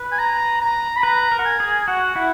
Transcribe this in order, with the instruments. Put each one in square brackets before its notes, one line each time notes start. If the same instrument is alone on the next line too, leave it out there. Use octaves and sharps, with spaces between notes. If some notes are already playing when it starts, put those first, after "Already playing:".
Already playing: [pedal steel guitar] B4
[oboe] G#5
A#5
A#5
B5
[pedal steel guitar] B4 [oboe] A#5
[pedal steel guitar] A#4
[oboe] F#5
G#5
[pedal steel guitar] G#4
[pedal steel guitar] F#4 [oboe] F#5
[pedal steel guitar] E4 [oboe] F#5